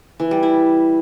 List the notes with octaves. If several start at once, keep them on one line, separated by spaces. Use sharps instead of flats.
E3
G3
E4